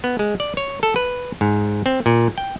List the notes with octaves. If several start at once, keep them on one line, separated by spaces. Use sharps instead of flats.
B3
G#3
D5
C#5
A4
B4
G#2
C4
A#2
G5